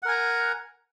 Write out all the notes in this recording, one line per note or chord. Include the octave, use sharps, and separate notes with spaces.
A#4 F#5 G#5 A#5